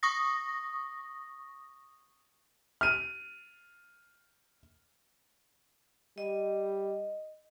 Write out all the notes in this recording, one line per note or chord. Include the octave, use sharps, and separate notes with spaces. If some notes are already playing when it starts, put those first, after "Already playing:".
C#6 D#6 A#6
F6 D#7
G3 D#5